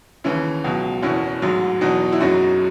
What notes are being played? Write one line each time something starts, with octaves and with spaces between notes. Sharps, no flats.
D#2 C#3 E3 C#4 E4
C#2 B2 F#3
F#1 E2 B2 C#4 E4
A1 G#2 F#3
E2 B2 F#3 D#4 F#4
E4
F#1 F#2 C#3 F#3 D#4 F#4